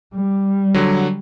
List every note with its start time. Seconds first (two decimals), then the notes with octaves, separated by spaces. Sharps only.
0.15 G3
0.74 D3 F#3